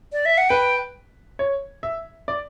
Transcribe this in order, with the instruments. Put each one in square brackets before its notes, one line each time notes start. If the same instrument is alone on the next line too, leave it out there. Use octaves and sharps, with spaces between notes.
[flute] D5
E5
F#5
[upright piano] B4 [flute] G5
[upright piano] C#5
E5
D5